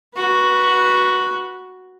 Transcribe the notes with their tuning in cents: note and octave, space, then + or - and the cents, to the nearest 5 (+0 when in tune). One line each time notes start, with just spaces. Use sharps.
F#4 +0 B4 -20